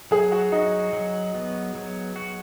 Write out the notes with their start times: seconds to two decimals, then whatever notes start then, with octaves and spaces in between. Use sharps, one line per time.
0.11 F#3 G#4
0.32 F#4
0.52 D#4 F#4
0.93 F#3
1.35 B3
1.75 F#3
2.16 F#4